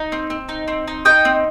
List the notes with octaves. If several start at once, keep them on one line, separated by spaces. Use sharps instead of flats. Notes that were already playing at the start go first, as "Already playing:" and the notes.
Already playing: D#4
C4
C4
D#4
C4
D#4
D#4 D#5 G5
C4